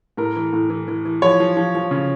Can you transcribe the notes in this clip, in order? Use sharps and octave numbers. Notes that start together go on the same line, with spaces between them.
A2 A#4
E3
A2
E3
E3
E3
F3 C#5
F3
F3
F3
C#3